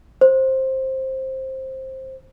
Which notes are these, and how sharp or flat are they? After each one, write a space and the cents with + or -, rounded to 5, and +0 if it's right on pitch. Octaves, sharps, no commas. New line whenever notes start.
C5 +15